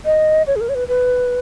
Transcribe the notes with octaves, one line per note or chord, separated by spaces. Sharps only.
D#5
C#5
G#4
A#4
C#5
B4
B4